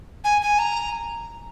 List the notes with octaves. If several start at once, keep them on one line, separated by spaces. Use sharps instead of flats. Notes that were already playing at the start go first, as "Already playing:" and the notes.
G#5
G#5
A#5